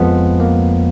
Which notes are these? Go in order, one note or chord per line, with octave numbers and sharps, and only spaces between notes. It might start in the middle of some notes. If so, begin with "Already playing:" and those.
Already playing: F2 F3 G#3 B3
A#3